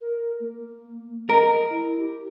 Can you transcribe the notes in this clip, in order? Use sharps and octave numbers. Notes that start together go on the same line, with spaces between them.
A#4
A#3
A#4 D#5
E4
G4